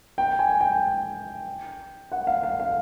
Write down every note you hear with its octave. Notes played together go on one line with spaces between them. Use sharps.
G5
G#5
G5
F#5
F5
F5
F5